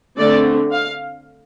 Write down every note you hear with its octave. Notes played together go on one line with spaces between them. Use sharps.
D3 A3 C4 D5
F5